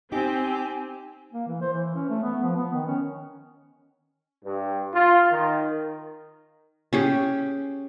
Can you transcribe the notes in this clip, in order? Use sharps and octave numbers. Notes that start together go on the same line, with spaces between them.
C4 D#4 G4 G#5
A#3
E3
C5
E3
C#4
A3
B3
F3
B3
D#3
C#4
G2
F4
D#3
C#4 G4 G#4